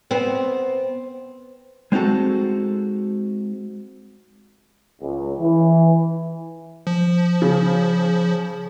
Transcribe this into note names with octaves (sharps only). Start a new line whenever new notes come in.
B3 C4
G#3 C4 D#4 F#4 A4
C#2
E3
F3
C#3